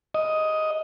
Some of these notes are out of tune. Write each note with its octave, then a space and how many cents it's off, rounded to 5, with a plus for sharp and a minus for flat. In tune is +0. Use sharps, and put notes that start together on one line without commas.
D#5 +10